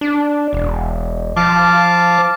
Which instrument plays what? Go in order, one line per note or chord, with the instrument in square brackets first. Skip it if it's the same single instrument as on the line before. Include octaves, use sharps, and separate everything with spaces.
[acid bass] D4
E1
[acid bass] F3 [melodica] F5 A5 D6